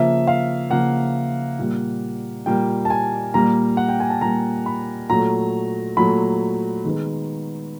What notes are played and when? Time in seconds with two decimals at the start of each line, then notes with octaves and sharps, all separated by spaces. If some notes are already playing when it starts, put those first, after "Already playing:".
Already playing: C#3 F3 A#3 E5
0.28 F5
0.70 C#3 F3 A#3 F#5
1.59 A#2 G3 A#3
2.46 A#2 G3 A#3 G5
2.85 A5
2.90 G#5
3.34 A#2 G3 A#3 A#5
3.77 F#5
3.89 G5
4.00 G#5
4.10 A5
4.21 A#2 G3 A#3 A#5
4.66 B5
5.10 A#2 F#3 A3 A#5
5.97 A#2 F#3 A3 B5
6.85 D#3 G#3 B3